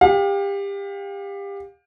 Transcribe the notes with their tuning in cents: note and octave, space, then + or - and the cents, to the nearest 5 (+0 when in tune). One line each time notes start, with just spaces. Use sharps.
G4 +25 F5 +35